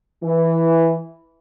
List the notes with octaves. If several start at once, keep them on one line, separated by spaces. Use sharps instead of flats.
E3